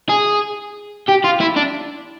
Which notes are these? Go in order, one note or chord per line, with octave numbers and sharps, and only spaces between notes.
G#4
G4
F4
E4
D4